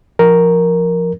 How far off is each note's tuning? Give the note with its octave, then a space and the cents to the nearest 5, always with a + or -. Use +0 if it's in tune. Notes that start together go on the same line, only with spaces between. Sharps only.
F3 +0 A#4 +0